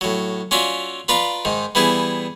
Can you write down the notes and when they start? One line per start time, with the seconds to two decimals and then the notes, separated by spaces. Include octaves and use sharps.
0.01 A2 F#3
0.51 C#4 F4 F#4 D5 E5
1.08 F4 B4 D5 F5 A#5 B5
1.45 G#2 D#3
1.75 E3 G3 B3 E4 G#4